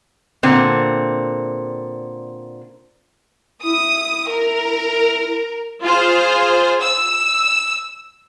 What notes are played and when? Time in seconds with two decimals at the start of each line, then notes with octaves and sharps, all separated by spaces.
0.43 A#2 D3 C4
3.63 E4 D#6
4.30 A#4
5.83 F4 G#4 C5
6.81 E6